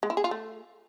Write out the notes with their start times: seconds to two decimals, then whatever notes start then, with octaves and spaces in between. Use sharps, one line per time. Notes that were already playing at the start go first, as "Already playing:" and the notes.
0.03 G#3
0.10 E4
0.17 G#4
0.24 F4
0.31 A3